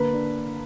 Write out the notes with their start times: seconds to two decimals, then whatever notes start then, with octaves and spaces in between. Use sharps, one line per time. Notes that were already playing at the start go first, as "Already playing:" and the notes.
Already playing: D3 A#3 B4
0.13 D4